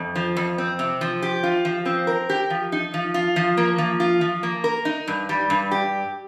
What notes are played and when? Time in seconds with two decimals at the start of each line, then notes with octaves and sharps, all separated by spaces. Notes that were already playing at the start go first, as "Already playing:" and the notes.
Already playing: F2
0.15 F3
0.37 F2
0.58 C4
0.79 C3
1.01 F3
1.23 G4
1.43 F4
1.65 F3
1.86 C4
2.07 A#4
2.30 G4
2.50 F3
2.72 D#4
2.94 F3
3.14 F4
3.36 F3
3.57 A#3
3.78 F3
4.00 F4
4.21 F3
4.43 A#3
4.64 A#4
4.85 D#4
5.08 G2
5.29 G3
5.50 G2
5.71 G4